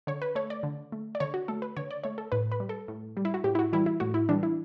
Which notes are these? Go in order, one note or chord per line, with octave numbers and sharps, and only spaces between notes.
D3 C#5
B4
A3 C#5
D5
D3
A3
D5
D3 C#5
F#4
A3 A4
B4
D3 C#5
D5
A3 C#5
A4
A2 B4
B4
G3
A4
A2
G3
E4
F#4
A2 G4
E4
F#4
E3 G3 E4
E4
A2 F#4
E4
E3 G3 D4
E4